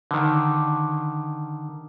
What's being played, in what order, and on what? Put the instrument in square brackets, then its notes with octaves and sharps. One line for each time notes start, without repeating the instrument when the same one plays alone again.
[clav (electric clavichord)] D3 D#3